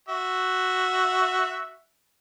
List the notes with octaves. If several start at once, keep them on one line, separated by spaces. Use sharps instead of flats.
F#4 E5